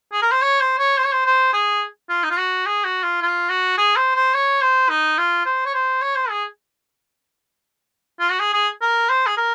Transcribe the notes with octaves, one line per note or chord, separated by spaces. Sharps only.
G#4
A#4
C5
C#5
C5
C#5
C5
C#5
C5
C5
G#4
F4
D#4
F4
F#4
G#4
F#4
F4
F4
F#4
G#4
C5
C5
C#5
C5
D#4
F4
C5
C#5
C5
C#5
C5
G#4
F4
F#4
G#4
G#4
A#4
C5
G#4
A#4